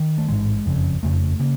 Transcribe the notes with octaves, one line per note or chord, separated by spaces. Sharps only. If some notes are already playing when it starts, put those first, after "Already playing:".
Already playing: D#3
A3
A1 G#2 G#3
F#1 F2 C#3
F#1 F2 C#3 A3
C#3 A#3